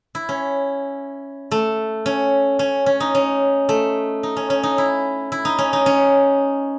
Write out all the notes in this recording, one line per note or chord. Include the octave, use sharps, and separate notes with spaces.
E4
C#4
A3
C#4
C#4
C#4
D#4
C#4
A3
D#4
C#4
C#4
D#4
E4
E4
D#4
C#4
D#4
C#4